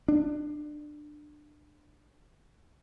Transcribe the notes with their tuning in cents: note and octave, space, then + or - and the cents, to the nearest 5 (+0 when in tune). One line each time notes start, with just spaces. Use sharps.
D4 +25